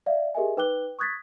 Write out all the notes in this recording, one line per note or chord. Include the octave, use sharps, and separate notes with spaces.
D5 E5 F5
G4 G#4 A#4 D#5 E5 G#5
D#4 B4 G5 D6 F#6 G7
C#6 D#6 F#6 G#6 A6 B6